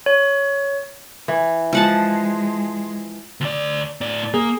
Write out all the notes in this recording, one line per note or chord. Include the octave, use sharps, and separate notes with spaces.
C#5
E3
F3 G#3 F#5 A5
D2 D5
A2 D5
A#3 G#4